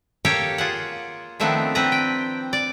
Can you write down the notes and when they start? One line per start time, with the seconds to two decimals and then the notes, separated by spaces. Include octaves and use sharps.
0.25 A#3 G4 A4 C#5 F5 G5
0.58 F4 G#4 F#5
1.40 D#3 F3 A3 B3 C4 D4
1.75 C4 D4 B4 A#5
1.92 G5
2.53 D5